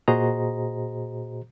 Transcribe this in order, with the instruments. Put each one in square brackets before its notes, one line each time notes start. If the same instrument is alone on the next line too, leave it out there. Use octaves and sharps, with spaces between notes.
[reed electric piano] A#2 F#4 G#4 C5 D#5 A#5